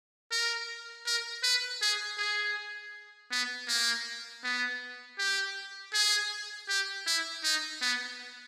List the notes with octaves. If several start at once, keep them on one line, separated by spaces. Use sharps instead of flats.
A#4
A#4
B4
G#4
G#4
B3
A#3
B3
G4
G#4
G4
E4
D#4
B3